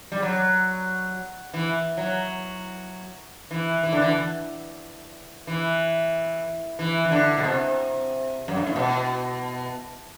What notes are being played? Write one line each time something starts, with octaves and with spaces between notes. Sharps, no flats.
G3
F#3
E3
F#3
E3
E3
D3
E3
E3
E3
E3
D3
B2
C3
F#2
G2
A2
B2